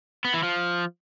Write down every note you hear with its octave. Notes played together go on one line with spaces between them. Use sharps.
B3
E3
F3